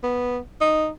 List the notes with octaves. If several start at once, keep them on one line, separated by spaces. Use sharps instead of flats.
B3
D#4